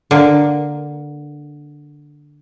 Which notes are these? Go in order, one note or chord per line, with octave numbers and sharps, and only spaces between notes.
D3 A#3